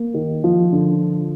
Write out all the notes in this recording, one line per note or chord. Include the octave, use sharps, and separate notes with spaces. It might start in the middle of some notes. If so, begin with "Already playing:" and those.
Already playing: A#3
D#3
F3
D3